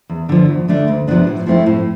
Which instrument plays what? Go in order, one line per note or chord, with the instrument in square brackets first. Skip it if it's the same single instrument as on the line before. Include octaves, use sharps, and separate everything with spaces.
[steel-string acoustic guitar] E2
D3 F3
E2
D3 A3 D4
D2
C3 F3 B3 D4
A2
F3 A3 C4 E4
A2